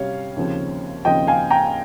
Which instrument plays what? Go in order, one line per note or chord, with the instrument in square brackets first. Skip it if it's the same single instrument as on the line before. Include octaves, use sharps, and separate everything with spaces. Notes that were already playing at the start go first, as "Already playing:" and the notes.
Already playing: [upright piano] C3 G3 C#4 C#5 F5
D#2 C#3 F3 C4
D#2 C#3 F3 C4 D#5 G5
F5 G#5
G5 A#5